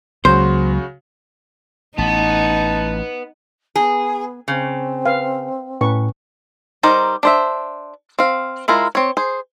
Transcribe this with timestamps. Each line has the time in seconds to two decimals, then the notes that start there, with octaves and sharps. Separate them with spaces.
0.25 C#2 C#3 F#3 A#3 F#4 C5
1.98 A1 B3 D#4 A5
3.76 B3 G#4 A#5
4.48 C#3 C4
5.06 B4 F5
5.81 A2 C#4 B4 C#6
6.83 G3 D#4 A#4 C5 D5
7.23 D4 C5 E5
8.19 C4 F5
8.68 G#3 E4 F4 A#4
8.95 C4 C#5
9.17 G#4 C5